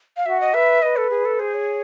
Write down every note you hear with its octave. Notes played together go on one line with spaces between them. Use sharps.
F5
F#4 E5
D#5
B4 E5
B4 D#5
A4
G#4
A4
G#4 C5
C#5